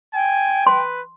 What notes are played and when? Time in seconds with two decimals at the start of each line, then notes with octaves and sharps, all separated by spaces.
0.14 G5 G#5
0.67 B4 C6